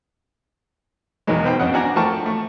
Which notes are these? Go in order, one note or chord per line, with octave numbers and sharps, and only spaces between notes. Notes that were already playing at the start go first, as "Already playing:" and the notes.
B1 E2 B2 D#3 F#3 G#3
B2 B4 C5 G5
F2 C4 C#4 D#5 F#5
D4 F#4 D5 F#5 G#5 A#5
F3 A3 A#4 G5 A5 C#6
A3